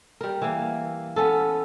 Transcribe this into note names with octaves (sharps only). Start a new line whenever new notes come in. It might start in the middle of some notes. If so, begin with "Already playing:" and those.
G3 A#4
E3 A#3
B3 C#4 A4